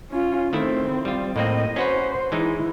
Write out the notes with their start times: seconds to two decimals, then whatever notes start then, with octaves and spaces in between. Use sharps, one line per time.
0.11 C#4 F4
0.53 D#3 A3 C4 E4
1.05 G3 F4
1.36 A2 A#3 C4 D#5
1.76 C#4 F#4 B4 C5
2.32 E3 G#3 D#4 E4